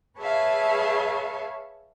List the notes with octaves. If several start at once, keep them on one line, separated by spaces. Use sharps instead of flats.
G#4 B4 C#5 E5 F5 A5